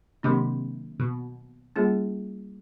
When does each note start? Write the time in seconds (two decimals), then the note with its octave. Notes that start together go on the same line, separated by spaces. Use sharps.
0.23 C3 D#3 F#3 A#3 D4
1.00 B2
1.76 G3 A#3 C#4 F4 G#4